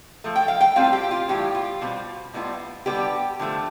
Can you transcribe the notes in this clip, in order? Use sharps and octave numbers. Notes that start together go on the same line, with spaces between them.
F3 A3
G5
F5
G5
A2 G3 C4 F4 F5
G4
F4
A2 E3 G3 G4
F4
B2 G3 C4 F4
A2 G3 B3 D4 F4
D3 G3 B3 G4
D3 F3 A3